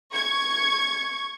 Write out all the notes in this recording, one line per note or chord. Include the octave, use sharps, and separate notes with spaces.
C#6 G#6